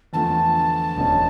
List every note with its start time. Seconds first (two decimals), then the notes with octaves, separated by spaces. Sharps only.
0.13 E2 D3 F3 A3 A5
0.96 E1 D2 D3 A3 C#4